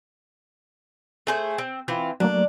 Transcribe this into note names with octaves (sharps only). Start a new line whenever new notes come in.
A3 G#4 C5
C4
E3 C4 F4
F#3 A3 A#3 D4